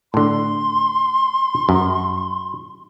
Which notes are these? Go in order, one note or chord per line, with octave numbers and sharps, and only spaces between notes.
A2 D3 C6
F#2